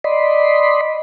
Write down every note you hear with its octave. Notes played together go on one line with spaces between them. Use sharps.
D5 D#5 B5 C6